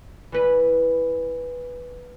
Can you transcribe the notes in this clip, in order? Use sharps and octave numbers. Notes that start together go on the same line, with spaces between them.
E3 B4